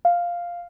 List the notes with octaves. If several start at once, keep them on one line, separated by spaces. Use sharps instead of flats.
F5